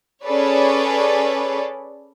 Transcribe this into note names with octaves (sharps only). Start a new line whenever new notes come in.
C#4 G#4 A4 B4 C#5 D5